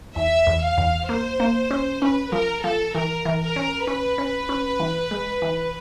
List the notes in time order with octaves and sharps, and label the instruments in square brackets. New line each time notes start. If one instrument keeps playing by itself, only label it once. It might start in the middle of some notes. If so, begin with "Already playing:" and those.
[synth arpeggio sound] E2 [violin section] E5
[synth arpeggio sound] E2
[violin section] F5
[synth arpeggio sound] E2
[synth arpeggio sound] A#3 [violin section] C5
[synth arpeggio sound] A#3
C#4
[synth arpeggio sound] C#4 [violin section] B4
[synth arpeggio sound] F3 [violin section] A#4
[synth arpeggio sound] F3 [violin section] A4
[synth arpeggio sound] E3 [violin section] A#4
[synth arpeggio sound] E3
[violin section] A#4
[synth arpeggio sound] C#4
[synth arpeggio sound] C#4 [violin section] B4
[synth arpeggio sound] C#4
C#4
E3
G#3
E3